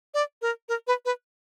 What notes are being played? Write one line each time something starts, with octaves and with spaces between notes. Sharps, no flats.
D5
A#4
A#4
B4
B4